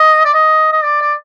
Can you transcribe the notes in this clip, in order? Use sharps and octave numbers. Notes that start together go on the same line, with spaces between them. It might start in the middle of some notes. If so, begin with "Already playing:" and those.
Already playing: D#5
D5
D#5
D#5
D5
D5